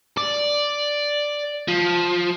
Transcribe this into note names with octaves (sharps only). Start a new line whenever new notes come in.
D5
F3